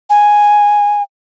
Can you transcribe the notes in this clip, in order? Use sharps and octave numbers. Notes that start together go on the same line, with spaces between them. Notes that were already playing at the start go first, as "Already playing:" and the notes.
G#5